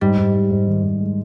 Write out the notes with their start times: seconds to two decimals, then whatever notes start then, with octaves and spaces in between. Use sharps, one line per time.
0.01 G#2 G3
0.18 G#2
0.34 G#2
0.51 G#2
0.67 D#3
0.84 G#2
1.00 G#3